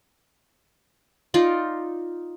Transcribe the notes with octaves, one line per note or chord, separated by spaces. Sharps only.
D#4 F4 D5